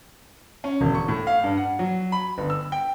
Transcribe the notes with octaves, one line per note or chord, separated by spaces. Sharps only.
C#4
E1
C#6
A2
F5
G2
F#5
F#3
B5
G1
E6
G5